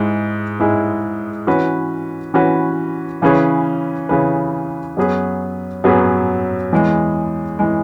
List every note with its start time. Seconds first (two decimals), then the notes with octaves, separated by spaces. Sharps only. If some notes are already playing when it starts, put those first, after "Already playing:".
Already playing: G#2 G#3 E4 G#4
0.60 G#2 G#3 E4 G#4
1.47 E3 C#4 F#4 B4
2.34 E3 C#4 F#4 B4
3.22 C#3 E3 C#4 G#4 B4
4.09 C#3 E3 C#4 G#4 B4
4.97 F#2 F#3 B3 G#4 B4
5.84 F#2 F#3 B3 G#4 B4
6.72 E2 E3 G#3
7.59 E3 G#3